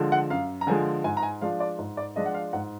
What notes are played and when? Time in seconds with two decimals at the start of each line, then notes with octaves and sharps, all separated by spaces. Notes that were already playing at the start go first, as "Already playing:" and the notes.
Already playing: D3 F3 G#3
0.12 F#5
0.30 F#2 F5
0.61 A#5
0.67 D3 F3 G#3 G#5
1.04 G#2 G#5
1.17 A#5
1.23 G#5
1.42 F3 G#3 D4 F4 F5
1.60 D5
1.79 G#2
1.97 D5
2.16 F3 G#3 D4 F4 D#5
2.26 F#5
2.34 F5
2.53 G#2 F#5